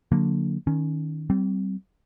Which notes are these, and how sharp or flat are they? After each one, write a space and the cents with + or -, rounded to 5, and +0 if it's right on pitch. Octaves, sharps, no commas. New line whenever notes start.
D3 +0 F#3 -25 A#3 +0
D#3 +0 C#4 +10
G3 -30 C4 -5